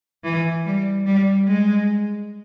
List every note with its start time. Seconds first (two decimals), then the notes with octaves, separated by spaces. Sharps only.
0.24 E3
0.65 G3
1.06 G3
1.47 G#3